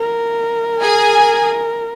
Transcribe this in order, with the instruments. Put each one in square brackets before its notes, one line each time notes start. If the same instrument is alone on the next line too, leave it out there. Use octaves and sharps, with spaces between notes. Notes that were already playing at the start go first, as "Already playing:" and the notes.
Already playing: [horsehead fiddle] A#4
[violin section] G#4 G#5